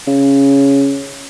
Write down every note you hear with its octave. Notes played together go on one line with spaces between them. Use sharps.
C#3